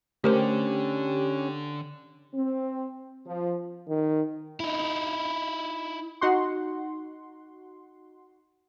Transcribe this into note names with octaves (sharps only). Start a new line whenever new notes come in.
D3 A3 C#4 D4 G4 A#4 C5
C4
F3
D#3
D#4 E4
D#4 F#4 F#5 C6